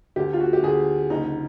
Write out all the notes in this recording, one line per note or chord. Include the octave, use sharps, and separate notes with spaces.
D2 G4
F4
F#4
G4
D2 G#4
F#1 D#4